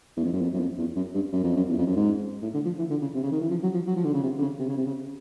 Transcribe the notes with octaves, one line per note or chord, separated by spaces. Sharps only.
E2
F2
F#2
F2
F#2
F2
E2
F#2
G2
F#2
F2
F#2
E2
F2
F#2
G#2
A2
D3
F3
E3
D3
C#3
C3
C#3
D#3
E3
F3
F#3
F3
F#3
F3
D3
C#3
C3
D3
C#3
C3
C#3
C3
C#3